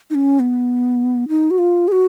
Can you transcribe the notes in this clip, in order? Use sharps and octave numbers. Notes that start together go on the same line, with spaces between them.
D#4
C#4
B3
D#4
F#4
F4
G#4
F#4